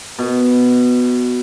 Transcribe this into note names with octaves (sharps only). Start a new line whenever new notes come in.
B2